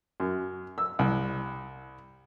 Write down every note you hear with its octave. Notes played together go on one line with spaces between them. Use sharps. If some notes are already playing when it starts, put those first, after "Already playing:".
F#2
E6
C2